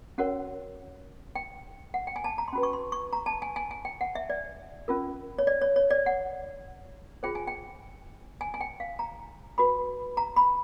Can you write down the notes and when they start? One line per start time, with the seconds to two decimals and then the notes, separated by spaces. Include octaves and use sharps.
0.18 C#4 F#4 A#4 C#5 F#5
1.35 G5
1.94 F#5
2.07 G5
2.16 G#5
2.24 A5
2.38 A#5
2.48 C6
2.53 C#4 F#4 B4 B5
2.63 C#6
2.73 C6
2.92 C#6
3.13 A#5
3.26 A5
3.42 G#5
3.56 G#5
3.71 G#5
3.85 G5
4.01 F#5
4.15 E5
4.30 D5
4.88 C#4 F4 A#4
5.39 C#5
5.47 D5
5.62 C#5
5.76 C#5
5.90 D5
6.06 F#5
7.23 F4 G#4 C5 G5
7.35 G#5
7.47 G5
8.41 G#5
8.54 G#5
8.61 G5
8.80 F5
8.99 A#5
9.58 F#4 B4 B5
10.17 A#5
10.36 B5